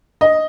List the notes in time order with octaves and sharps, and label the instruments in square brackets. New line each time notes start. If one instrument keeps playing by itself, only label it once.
[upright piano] D#5